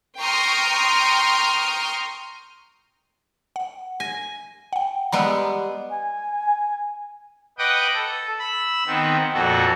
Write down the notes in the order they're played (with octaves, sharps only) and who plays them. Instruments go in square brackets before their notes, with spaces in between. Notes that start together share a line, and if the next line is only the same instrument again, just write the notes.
[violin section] G5 A#5 C6 C#6 D#6 F6
[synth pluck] F#5
[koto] G#5 [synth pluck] A#6
[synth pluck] F#5 G5
[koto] G3 G#3 B3 [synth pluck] A#5 B5 E6
[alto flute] G#5
[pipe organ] B4 D#5 F#5 G5 D6 D#6
A4
B5 E6
D#3 B3 C4
F2 A#2 F#4 A4